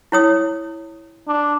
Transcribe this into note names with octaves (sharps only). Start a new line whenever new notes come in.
E4 C#5 D#6
D4